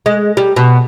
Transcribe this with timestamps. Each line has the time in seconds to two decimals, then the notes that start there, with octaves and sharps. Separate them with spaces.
0.06 G#3
0.37 G3
0.56 B2